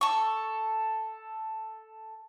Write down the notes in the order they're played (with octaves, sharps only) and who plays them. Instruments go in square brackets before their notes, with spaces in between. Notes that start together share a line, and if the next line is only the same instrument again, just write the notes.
[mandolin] A4 C#6